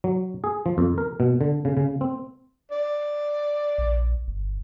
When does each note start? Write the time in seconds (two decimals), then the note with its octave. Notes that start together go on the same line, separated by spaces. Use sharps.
0.04 F#3
0.44 G#4
0.66 F3
0.78 F2
0.98 A#4
1.20 B2
1.41 D3
1.65 C#3
1.77 C#3
2.01 C4
2.71 D5
3.78 A#1
4.28 G1